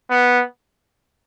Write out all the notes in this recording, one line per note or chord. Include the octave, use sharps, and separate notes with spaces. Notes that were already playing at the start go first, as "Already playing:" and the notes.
B3